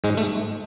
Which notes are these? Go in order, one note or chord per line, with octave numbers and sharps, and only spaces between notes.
G#2 G#3
A3